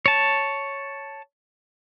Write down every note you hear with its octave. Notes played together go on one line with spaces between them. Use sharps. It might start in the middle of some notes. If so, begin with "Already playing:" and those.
C#5 A5